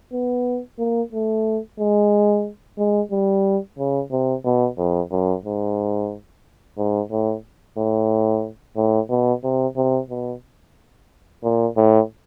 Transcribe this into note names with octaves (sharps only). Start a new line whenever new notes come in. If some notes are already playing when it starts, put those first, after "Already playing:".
B3
A#3
A3
G#3
G#3
G3
C#3
C3
B2
F2
F#2
G#2
G#2
A2
A2
A2
B2
C3
C3
B2
A#2
A2